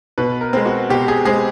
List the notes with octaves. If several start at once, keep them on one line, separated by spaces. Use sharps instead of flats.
B2 B4
A#4
G#3 C4
F#4
B2 G4
G#4
G#3 C4 G#4